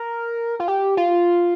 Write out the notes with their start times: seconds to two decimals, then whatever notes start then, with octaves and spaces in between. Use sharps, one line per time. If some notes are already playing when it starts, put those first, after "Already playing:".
Already playing: A#4
0.60 F4
0.68 G4
0.97 F4